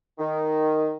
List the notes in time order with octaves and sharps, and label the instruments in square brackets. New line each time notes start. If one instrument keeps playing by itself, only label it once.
[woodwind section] D#3